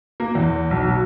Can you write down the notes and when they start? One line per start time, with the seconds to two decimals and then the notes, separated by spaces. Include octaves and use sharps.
0.20 A#3
0.35 E2
0.71 B1
0.89 F#3